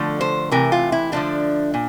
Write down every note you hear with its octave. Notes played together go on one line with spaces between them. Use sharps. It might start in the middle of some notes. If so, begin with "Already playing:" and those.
Already playing: D3 F3 A3
C5
C3 E3 A3 A#4
F4
E4
D3 F3 A3 D4
A#2